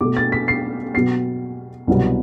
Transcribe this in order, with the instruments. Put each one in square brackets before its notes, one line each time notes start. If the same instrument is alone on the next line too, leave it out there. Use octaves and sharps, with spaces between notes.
[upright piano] B2 A3 D6
A6
B6
C7
B2 F#3 B3 C7
C2 B2 F#3 B3